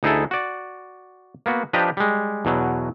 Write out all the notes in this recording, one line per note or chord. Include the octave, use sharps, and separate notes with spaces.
D2 D#4 E4 G#4 A4
F#4 D5
A#3 B3 F#4
F3 D4 G4 B4 D#5 A#5
G3 G#3
E2 B2 F#3